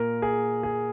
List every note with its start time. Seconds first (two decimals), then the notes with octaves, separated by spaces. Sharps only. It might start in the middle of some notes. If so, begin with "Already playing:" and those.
Already playing: A#2 A#3 A#4
0.22 G#4
0.63 G#4